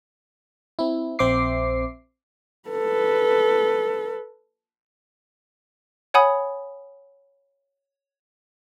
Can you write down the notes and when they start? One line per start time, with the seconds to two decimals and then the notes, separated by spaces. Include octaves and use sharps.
0.79 C4 E4
1.19 A#1 C4 C5 E5 D6 C7
2.69 A4 B4
6.14 C#5 F#5 G#5 B5 D#6